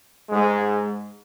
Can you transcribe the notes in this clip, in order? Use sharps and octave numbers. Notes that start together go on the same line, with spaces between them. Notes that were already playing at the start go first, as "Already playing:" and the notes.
G#2 G#3